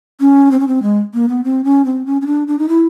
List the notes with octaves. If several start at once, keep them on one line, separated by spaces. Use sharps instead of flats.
C#4
C4
C#4
C4
G#3
A#3
B3
C4
C#4
C4
C#4
C#4
D4
D4
D#4
E4